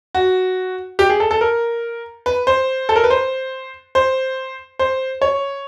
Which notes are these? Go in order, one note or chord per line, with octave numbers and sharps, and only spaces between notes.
F#4
G4
G#4
A4
A4
A#4
B4
C5
A4
A#4
B4
C5
C5
C5
C#5